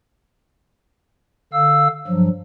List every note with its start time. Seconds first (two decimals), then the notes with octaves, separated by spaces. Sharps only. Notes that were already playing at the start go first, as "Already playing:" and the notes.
1.53 D3 F5 E6
2.07 G2 F3 F#3